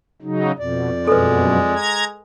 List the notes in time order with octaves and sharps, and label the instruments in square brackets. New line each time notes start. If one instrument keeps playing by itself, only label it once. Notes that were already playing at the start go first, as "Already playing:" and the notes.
[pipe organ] C#3 F#3 D#4
[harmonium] F2 D5 [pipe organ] B2
[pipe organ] F#2 B2 [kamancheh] G#3 [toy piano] A4 B4
[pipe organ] A#5 G#6